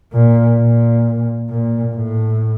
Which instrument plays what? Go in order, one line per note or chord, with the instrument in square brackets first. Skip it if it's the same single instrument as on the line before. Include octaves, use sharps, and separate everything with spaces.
[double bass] A#2
A#2
A#2
A2